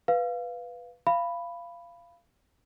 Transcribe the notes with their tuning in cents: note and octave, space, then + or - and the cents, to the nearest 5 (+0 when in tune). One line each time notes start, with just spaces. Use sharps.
B4 +0 F5 +0
F5 -20 B5 +0